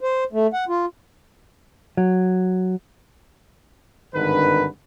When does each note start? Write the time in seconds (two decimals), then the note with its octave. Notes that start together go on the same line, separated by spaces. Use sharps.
0.01 C5
0.33 A3
0.53 F#5
0.69 F4
1.97 F#3
4.15 G#1 G2 D3 D#3 B4